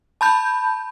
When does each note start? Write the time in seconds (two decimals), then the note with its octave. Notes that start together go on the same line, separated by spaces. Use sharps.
0.21 A5 B5 G6